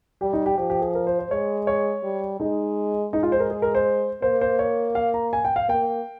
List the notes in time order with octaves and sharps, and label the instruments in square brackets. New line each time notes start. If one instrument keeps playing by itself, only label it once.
[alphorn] G3 [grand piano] G4
[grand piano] D#4
G4
[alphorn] F3 [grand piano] G4
[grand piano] G4
G#4
A#4
C5
C5
[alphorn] G#3 [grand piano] C#5
[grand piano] C#5
[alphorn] G3
[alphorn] G#3 [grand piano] D#4
[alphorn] G#3 [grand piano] D#4
[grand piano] F4
C5
A#4
G#4
A#4
C5
[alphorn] A#3 [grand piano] C5
[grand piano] C5
C#5
F5
A#5
G#5
G5
F5
[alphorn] A#3 [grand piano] G5